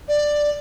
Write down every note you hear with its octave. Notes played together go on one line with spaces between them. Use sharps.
D5